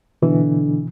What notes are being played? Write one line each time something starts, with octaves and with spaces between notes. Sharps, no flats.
B2 D3 E3